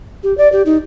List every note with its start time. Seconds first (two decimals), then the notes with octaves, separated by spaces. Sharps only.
0.23 G4
0.38 D5
0.52 G4
0.66 D#4